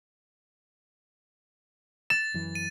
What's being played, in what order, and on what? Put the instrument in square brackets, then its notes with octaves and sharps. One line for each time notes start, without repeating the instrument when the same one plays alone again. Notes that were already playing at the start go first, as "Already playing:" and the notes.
[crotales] A6 [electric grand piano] E7
[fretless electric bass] F#2 E3
[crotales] D#7